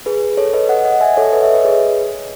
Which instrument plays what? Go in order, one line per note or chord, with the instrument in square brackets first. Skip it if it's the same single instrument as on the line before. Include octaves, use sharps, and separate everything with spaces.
[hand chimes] G#4 B4
A4 C#5
B4 D#5
D#5 F#5
D#5 F#5
E5 G#5
A4 C#5
B4 D#5
C#5 E5
B4 D#5
G#4 B4